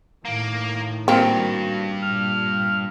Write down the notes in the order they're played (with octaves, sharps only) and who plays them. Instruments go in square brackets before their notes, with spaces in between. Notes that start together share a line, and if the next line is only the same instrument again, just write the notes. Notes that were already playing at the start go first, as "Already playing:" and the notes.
[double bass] A2 D#3 [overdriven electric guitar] A#3
[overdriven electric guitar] G2 [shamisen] A#3 C4 [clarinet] F#4
[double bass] A#2 [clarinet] F6